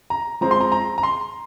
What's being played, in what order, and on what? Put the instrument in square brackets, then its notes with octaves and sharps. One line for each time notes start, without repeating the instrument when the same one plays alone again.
[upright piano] A#5
F3 G#3 C4 A#5
C6
A#5
A#5
A#5
C6